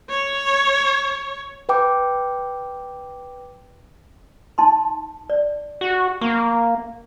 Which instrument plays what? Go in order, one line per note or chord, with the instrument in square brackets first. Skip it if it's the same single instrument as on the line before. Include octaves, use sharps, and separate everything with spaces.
[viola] C#5
[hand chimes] B4 G5 D6
[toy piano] D#4 A5 C6
D5
[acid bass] F#4
[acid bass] A#3 [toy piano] C#6